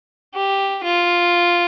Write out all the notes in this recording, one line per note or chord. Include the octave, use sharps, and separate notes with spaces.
G4
F4